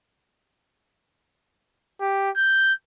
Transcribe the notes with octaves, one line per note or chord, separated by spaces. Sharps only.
G4
G6